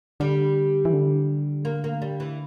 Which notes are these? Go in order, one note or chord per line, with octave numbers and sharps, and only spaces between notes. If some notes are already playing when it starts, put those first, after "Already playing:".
D3 G3
E3
D3
A#3
A#3
G3
E3